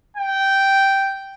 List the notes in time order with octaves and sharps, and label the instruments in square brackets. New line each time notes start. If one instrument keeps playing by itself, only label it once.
[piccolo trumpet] G5